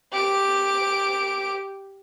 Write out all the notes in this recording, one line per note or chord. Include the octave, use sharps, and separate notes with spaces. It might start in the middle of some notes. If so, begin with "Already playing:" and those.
G4 D7